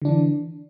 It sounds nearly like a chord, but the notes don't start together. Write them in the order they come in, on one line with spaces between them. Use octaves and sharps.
D3 D4 E3